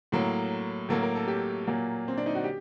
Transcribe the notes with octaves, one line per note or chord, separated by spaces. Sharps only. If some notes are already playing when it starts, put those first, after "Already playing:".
A2 F#3 A#3
A2 F#3 A#3 A4
A#4
A4
G4
A#2 F#3 A#3
C4
D4
D#4
F#4
G4